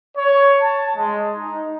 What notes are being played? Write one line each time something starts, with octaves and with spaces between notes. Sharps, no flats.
C#5
A5
G#3
D#4